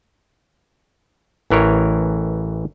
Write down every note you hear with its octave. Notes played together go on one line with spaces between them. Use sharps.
A1 E3 A#4 C#5